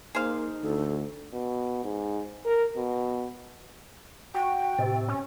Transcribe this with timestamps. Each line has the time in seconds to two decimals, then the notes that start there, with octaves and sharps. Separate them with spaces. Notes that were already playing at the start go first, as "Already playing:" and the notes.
0.15 A#3 D#4 G#4 C5 F5
0.63 D2 A4
1.33 B2
1.84 G#2
2.45 A#4
2.76 B2
4.34 F#4 G5
4.78 A2 C3
5.08 C#4